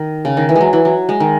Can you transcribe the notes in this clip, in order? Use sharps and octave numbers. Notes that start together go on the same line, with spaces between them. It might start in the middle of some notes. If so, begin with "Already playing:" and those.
Already playing: D#3
C#3
D#3
E3
G#3
F#3
E3
F#3
G#3
D#3